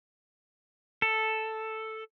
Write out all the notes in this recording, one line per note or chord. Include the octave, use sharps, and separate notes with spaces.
A4